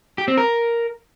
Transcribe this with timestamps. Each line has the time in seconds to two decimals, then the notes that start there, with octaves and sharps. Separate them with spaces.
0.18 G4
0.28 C4
0.37 A#4